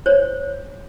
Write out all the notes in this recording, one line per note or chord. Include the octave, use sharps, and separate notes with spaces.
C5 C#5